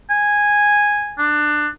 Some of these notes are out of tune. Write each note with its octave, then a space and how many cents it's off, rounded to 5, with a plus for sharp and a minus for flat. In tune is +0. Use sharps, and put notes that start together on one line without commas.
G#5 -5
D4 +20